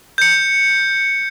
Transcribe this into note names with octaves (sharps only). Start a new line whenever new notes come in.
G6 C#7